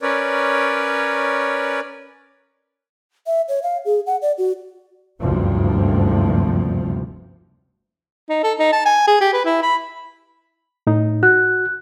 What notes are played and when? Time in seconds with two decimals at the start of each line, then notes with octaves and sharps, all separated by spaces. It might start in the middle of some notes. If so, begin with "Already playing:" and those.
0.02 C#4 A#4 B4 C#5 D5
3.27 E5
3.48 C#5
3.63 F5
3.85 G#4
4.07 F#5
4.22 D5
4.38 F#4
5.20 F#1 D2 G2 C3 F3
8.29 D#4
8.43 A4
8.59 D#4
8.72 A5
8.85 G#5
9.07 G#4
9.20 G4
9.33 B4
9.45 E4
9.62 B5
10.87 A2 D#4
11.23 F#4 F#6